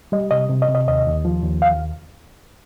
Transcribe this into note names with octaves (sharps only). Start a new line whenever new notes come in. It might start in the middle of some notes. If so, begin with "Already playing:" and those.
G3 D#5
C3 D#5
C3
D#5
C3
D#5
D#2 D#5
D#2
F3
D#2
F5